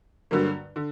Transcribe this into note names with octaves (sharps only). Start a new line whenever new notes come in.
G2 D3 F#3 A#3
D3